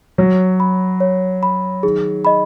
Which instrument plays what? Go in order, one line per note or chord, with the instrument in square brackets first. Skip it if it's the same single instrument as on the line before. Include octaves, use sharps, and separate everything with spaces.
[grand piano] F#3 [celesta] C#5
[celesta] B5
C#5
B5
[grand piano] D#3 [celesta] G#4
[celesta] D#5 B5